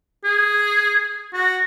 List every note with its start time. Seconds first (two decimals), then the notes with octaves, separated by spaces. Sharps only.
0.24 G#4
1.33 F#4